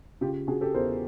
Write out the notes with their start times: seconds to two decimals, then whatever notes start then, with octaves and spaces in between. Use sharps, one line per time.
0.21 C#3 F4 G4
0.47 C#3 F#4 G#4
0.61 G4 A4
0.74 E2 A#4 C5